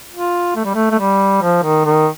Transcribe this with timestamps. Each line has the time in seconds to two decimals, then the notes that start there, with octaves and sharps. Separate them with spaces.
0.12 F4
0.56 A3
0.65 G3
0.74 A3
0.91 A3
0.99 G3
1.42 F3
1.63 D#3
1.85 D#3